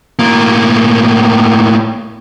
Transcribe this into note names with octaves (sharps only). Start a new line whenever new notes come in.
A2 A#3